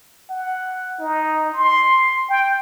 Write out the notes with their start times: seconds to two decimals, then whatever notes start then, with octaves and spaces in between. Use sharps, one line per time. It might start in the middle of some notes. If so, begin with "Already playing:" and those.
0.30 F#5
1.00 D#4
1.54 C6
2.30 G5